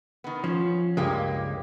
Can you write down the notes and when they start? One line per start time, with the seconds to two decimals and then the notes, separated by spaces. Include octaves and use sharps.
0.24 D#3 B3
0.44 F3 C#4
0.97 C#2 G2 G#3 A#3 G4